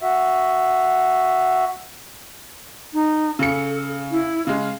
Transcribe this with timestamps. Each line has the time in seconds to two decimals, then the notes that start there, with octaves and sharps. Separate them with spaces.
0.01 F#4 E5
2.93 D#4
3.39 C#3 A4 C#7
4.11 E4
4.47 C#3 G#3 F5